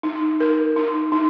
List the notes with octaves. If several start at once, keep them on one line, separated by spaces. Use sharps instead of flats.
D#4
A#4
D#4
D#4